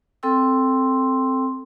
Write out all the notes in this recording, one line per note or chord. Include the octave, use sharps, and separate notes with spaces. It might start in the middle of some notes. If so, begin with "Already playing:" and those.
C4 A4 G5 C6 E6